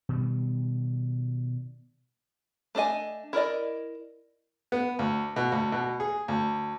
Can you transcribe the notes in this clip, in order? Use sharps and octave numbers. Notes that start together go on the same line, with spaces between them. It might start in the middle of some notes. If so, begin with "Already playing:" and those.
B2 D#3 G3
A3 D4 A4 D#5 G#5
E4 A#4 D5 D#5
B3
D2
B2
D2
B2
G#4
D2